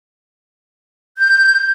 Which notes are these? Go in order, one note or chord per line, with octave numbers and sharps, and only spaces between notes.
G6